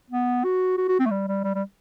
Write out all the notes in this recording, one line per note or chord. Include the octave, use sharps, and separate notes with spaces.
B3
F#4
F#4
F#4
C4
A3
G3
G3
G3
G3